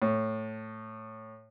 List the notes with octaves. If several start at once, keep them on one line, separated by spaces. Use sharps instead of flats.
A2